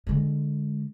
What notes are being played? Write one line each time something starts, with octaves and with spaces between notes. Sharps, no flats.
D3 G#3